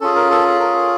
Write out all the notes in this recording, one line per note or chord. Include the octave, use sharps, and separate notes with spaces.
C#4 F4 G#4 A4
A#4
A4
A#4